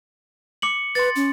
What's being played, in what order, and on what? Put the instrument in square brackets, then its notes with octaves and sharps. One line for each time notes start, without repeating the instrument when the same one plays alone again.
[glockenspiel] D6 C#7 F#7
[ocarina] B4 [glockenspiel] C6 A6
[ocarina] C#4